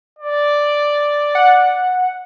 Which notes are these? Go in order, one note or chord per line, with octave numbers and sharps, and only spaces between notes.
D5
F#5